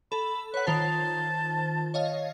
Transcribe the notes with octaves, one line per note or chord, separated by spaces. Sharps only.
A4 B5
B4 C#5 F#5
D#3 F4 C5 A5
C#5 D#5 F5